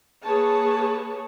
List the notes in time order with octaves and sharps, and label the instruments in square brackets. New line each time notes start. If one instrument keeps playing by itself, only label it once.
[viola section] A#3 G#4 B4 C#5 A5